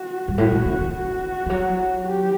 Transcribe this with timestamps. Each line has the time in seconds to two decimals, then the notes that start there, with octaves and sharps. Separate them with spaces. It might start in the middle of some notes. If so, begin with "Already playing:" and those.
Already playing: F#4
0.28 G2
0.38 A2 F#4
0.52 B2
0.65 C#3
0.80 D3
0.94 F#4
1.46 E3
1.50 F#3
2.06 G4